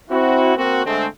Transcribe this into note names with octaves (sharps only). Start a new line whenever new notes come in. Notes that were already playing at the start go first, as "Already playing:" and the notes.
C4 E4 F#4
A#3 C4 F#4
D3 G#3 A3 C4